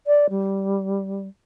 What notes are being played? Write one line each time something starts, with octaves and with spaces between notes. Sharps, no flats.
D5
G3